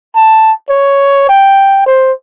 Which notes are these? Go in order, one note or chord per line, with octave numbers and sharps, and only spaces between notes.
A5
C#5
G5
C5